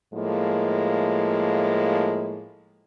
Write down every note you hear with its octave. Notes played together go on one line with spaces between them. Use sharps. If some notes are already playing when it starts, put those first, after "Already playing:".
A2 F3 G#3 A#3